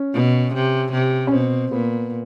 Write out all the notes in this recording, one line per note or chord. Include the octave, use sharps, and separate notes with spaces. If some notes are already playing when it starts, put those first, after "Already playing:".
Already playing: C#4
B2
C3
C3
C#4
B2 C4
A#2 B3